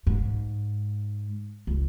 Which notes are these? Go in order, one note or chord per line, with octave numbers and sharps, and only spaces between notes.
G#2
C#2